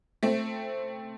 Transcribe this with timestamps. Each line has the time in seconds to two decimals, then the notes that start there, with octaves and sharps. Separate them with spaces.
0.23 A3 C4